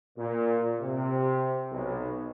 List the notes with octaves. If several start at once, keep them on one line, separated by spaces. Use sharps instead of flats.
A#2
C3
B1